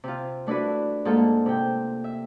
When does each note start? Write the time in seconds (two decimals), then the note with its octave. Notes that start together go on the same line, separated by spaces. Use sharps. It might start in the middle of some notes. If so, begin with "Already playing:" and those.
0.04 C3 F4
0.47 A3 D4 E4 F#4 B4
1.05 G#2 A#3 F4 A4
1.46 C3 G5
2.04 E5